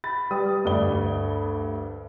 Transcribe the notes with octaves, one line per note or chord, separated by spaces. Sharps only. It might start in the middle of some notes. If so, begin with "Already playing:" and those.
B5 A6
G3 G4 B4 D#6
D2 G2 D5 G7